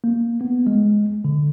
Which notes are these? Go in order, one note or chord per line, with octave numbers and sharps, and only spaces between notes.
A#3
B3
G#3
D3